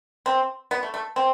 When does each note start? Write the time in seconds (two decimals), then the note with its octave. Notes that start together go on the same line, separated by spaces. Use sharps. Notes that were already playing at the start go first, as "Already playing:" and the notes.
0.26 C4
0.71 B3
0.83 A3
0.94 A3
1.16 C4